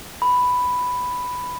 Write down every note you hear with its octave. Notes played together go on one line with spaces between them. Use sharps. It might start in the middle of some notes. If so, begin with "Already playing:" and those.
B5